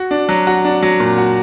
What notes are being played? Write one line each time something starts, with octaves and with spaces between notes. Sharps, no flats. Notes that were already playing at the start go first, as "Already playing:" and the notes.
Already playing: F#4
D4
F#3
F#4
D4
F#3
A#2
F#4